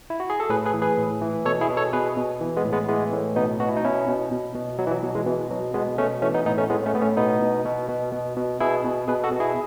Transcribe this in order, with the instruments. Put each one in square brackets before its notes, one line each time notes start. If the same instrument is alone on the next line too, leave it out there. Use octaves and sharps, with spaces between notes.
[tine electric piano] E4
F#4
G#4
A4
A2 G#4 B4
G#4 B4
E3
G#4 B4
A2
E3
B2 A4 C#5
E4 G#4
B2
A4 C#5
B2 G#4 B4
B2
E3
G#3 B3
A2
G#3 B3
E3 G#3 B3
A2
B2 B3 D#4
B2 F#4
E4
D#4
B2 C#4 E4
B2
B2
B2
B2 F#3
E3
F#3
B2 F#3
E3 G#3
B2 E3
B2 F#3
B2 G#3 B3
B2 A3 C#4
E3 A3 C#4
B3 D#4
A2 B3 D#4
A3 C#4
A2 G#3 B3
A3 C#4
A2 B3
A3 C#4
B2 B3 D#4
B2
B2
B2
B2
B2
B2 E4 G#4
B2
B2 G#4 B4
F#4 A4
B2
E4 G#4